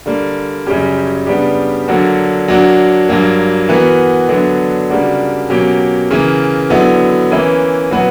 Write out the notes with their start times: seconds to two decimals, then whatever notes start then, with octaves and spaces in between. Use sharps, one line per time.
0.06 D3 G3 A#3
0.67 F#2 C#3 G3 C#4 G4
1.27 C#3 G3 B3 D4 G4
1.88 D3 F#3 A#3 D4 F#4
2.48 F#3 A#3 D4 F#4
3.09 G2 F#3 A#3
3.69 E3 B3 F#4 A#4
4.29 D3 F#3 B3 D4
4.90 C#3 G3 A#3 D4 F#4
5.50 B2 F#3 A#3 C#4 G4
6.11 C#3 E3 A#3
6.70 D3 F#3 B3 E4
7.31 E3 A#3 C#4 E4 B4
7.91 A#2 F#3 B3 F#4 B4